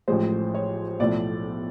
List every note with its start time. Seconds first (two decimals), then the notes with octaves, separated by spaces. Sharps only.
0.08 A1 A2 F3 G#3 C5
0.54 C#5
1.00 B1 A2 F3 A3 D5